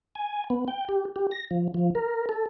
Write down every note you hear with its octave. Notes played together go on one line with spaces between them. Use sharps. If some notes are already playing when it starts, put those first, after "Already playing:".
G#5
B3
G5
G4
G4
A#6
F3
F3
A#4
A4